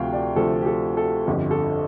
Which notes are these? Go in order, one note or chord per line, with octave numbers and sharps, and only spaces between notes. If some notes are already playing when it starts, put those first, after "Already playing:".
Already playing: D2 C3 F3 A3 F5 G5
D5
D2 C3 F3 A3 A4
G4
A4
A4
G1 F2 D3 G4
A4